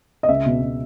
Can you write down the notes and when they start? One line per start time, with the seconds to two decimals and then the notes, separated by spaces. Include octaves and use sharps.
0.23 D#5
0.28 C#2 E5
0.46 B2
0.62 B2